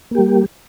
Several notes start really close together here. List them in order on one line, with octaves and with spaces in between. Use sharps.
A#3 G4 G3